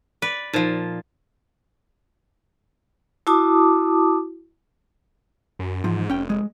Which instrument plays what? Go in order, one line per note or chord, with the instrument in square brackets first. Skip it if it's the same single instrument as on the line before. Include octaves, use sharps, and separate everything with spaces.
[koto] B4 D5
[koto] A#2 F3 [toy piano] D#4 C5
[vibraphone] E4 F#4 A5 D6 D#6
[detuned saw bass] F#2
[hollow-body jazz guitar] E2 F3 [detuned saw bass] G#2
[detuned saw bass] F1 [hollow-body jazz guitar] C#4 G5
[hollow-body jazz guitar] G#3